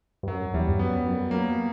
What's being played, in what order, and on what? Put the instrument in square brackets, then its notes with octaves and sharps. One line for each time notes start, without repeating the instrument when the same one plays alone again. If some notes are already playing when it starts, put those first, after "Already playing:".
[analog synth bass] G2
[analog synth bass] F#2 [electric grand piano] F#3
[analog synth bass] E2 [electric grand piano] G3
[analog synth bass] G2
[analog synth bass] F#2 [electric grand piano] B3
[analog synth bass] F#2
[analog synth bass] F#2 [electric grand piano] A#3